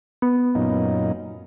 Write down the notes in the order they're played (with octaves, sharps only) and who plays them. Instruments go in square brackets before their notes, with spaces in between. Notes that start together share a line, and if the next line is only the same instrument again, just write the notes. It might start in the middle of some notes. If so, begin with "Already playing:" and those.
[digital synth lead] B3
[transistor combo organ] F#2 A#2 D#4